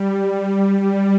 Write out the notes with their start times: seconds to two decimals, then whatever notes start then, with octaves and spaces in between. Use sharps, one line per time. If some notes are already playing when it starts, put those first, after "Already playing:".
Already playing: G3
0.79 G3